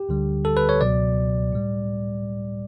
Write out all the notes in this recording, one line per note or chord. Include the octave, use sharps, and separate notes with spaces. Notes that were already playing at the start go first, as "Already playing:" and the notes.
Already playing: G4
D2 D3 G3
A4
B4
C#5
C#2 B2 F#3 D5
A2 G3